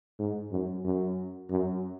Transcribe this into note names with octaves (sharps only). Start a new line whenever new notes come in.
G#2
F#2
F#2
F#2